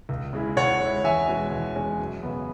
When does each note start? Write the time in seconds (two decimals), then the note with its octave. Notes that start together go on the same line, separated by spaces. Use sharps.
0.09 C#2
0.33 C#3 G#3 E4
0.57 C#2 C#5 F#5
0.81 C#3 G#3 E4
1.04 E2 E5 G#5
1.28 B2 G#3 C#4
1.51 E2
1.76 B2 G#3 C#4
1.99 F#2
2.23 C#3 F#3 B3